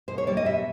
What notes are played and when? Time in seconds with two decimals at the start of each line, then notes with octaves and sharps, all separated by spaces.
0.08 B2 C5
0.18 C#5
0.27 G3 A#3 D5
0.37 D#5
0.45 B2 E5